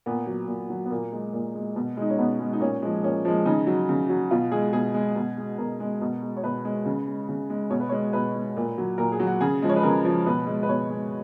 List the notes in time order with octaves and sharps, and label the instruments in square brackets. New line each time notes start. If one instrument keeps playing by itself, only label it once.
[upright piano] A#2 B3
F#3
A#2
F#3
B3
A#2 A#3
G#3
A#2
G#3
B2
G#3 D#4
C#4
B2 B3
G#3
D#4
A#2 C#4
F3 G#3
A#2 C#4
F3 G#3
C#3 D#4
F#3
C#3
F#3
B2 F4
G#3 G#4
B2 G#4
G#3
B2
G#3
B2 A#4
G#3
B2
G#3
C#5
B2 B4
G#3
C#3
G#3
C#3
G#3
B2 C#5
B4
G#3 C#5
B2 B4
G#3
A#2
F#3
A#2 A#4
G#4
F#3
F#4
C#3 G#4
F3 G#3
C#5
B4
C#3 A#4
F3 G#3
B2 B4
G#3
B4
B2 C#5
G#3